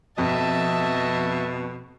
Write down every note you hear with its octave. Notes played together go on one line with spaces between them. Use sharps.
F2 B2 D#5 E5 A5